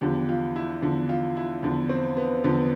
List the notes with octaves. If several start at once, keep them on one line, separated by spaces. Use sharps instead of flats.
E2 D3 F3 G4
F4
E4
E2 D3 F3
F4
E4
E2 D3 F3
C4
B3
E2 D3 F3 B3